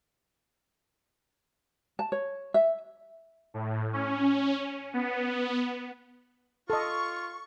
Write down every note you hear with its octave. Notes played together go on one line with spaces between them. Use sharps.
A5
C#5
E5
A2
C#4
B3
F4 A4 D#5 C#6